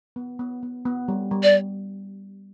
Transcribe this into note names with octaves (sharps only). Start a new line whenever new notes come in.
B3
B3
B3
B3
G3
G3
D5